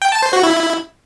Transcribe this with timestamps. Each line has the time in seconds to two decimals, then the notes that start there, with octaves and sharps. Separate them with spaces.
0.02 G5
0.12 A5
0.22 C5
0.33 F#4
0.43 E4